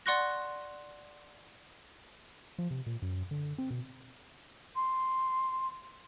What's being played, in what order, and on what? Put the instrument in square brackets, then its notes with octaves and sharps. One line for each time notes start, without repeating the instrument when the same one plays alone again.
[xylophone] D5 F#5 C6 C#6 F#6 A#6
[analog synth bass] F3
C3
A#2
F#2
D3
C4
B2
[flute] C6